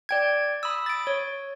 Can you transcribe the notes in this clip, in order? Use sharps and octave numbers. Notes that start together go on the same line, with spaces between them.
D5 G5 G#6
B5 D#6 E6
A6 D7
C#5